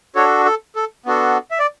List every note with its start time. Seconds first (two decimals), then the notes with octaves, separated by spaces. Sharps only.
0.15 D4 F#4 A4 C#5
0.46 A4
0.76 A4
1.06 B3 D4 F#4 A4
1.51 E5
1.59 D5